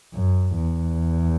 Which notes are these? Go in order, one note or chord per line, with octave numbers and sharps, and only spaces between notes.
F#2
E2